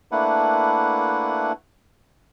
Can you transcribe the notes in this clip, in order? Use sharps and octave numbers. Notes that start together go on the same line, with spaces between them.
A3 A#3 D4 E4 B4 F#5